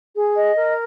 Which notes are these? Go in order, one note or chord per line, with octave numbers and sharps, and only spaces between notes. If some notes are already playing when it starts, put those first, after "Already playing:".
G#4
D#5
A#4